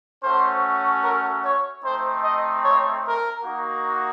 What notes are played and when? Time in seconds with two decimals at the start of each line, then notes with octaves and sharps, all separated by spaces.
0.22 A3 C#4 F#4 C5
1.03 A#4
1.43 C#5
1.83 A3 C4 D#4 C5
2.24 D#5
2.64 C#5
3.05 A#4
3.44 A#3 D#4 F#4